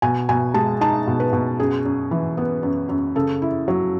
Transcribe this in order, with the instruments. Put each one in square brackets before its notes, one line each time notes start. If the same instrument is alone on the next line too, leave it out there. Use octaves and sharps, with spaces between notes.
[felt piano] B2 G#5
B2 G#5
G#3 A5
D#4 A5
B2
B4
B2
F#2 G#4
F#2
E3
B3
F#2
F#2
C#3 A4
E4
F#3